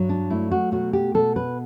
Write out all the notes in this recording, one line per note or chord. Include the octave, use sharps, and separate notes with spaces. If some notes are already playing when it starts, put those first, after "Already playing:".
Already playing: G2 F#3
D4
A3 E4
F#4
B2 F#4
G4
B2 A4
B4